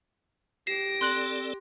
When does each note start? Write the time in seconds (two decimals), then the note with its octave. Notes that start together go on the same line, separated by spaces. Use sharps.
0.67 G4 A#6 C7 D7 E7
1.01 C4 A4 D5 C6 F#6 F#7